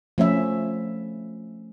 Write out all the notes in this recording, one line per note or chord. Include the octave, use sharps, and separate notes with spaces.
F3 A3 C#4 E5